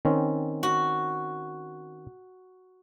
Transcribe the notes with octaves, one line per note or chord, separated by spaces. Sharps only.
D#3 C4 C#4
F#4